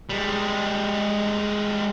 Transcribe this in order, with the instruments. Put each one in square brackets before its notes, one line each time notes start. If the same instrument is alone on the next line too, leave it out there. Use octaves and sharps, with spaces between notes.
[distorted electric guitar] G3 G#3